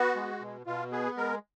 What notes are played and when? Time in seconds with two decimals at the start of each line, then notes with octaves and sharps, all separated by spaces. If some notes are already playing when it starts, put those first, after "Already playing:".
Already playing: B3 F#4
0.16 G#3
0.40 B2
0.66 B2 F4
0.92 B3 G#4
1.17 G#3 A#4